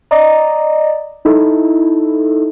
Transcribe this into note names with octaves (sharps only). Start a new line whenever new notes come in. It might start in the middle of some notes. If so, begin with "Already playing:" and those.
D5 D#5 A#5
D#4 E4 A4